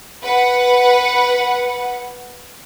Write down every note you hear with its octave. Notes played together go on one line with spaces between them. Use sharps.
B4 F#5